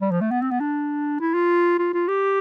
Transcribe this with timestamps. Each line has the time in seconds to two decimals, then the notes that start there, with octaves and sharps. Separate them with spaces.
0.01 G3
0.11 F3
0.21 A3
0.31 B3
0.42 C4
0.51 B3
0.60 D4
1.20 E4
1.34 F4
1.79 F4
1.94 F4
2.08 G4